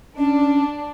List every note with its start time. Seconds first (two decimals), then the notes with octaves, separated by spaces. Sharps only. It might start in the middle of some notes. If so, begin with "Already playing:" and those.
0.18 C#4 D4